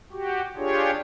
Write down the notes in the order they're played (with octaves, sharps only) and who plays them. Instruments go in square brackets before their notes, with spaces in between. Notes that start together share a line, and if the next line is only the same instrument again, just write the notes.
[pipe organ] F#4 G4
D4 F4 G4 G#4 C#5